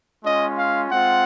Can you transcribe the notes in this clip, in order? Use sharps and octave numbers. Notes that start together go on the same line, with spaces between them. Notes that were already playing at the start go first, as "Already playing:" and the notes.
G#3 C#4 F4 D#5
F5
G#3 C4 F4 F#5